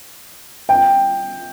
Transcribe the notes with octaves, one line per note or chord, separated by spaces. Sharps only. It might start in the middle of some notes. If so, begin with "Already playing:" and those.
G5